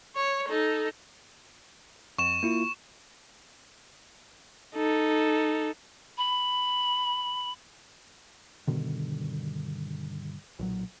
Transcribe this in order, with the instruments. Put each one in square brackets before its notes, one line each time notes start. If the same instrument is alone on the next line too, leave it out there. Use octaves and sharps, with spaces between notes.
[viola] C#5
D#4 A4
[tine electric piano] F2 [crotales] C#6 E7
[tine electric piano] A#3 E4 F4
[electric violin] D#4 A4
[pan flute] B5
[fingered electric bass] G2 B2 D3 D#3
B1 A#2 F#3